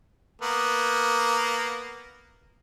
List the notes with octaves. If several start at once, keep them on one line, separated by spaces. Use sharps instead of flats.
A#3 B3